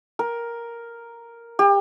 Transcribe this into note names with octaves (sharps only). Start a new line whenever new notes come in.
A#4
G4